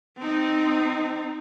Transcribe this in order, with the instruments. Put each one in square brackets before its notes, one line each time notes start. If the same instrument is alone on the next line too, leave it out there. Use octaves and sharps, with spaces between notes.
[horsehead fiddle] C4 D#4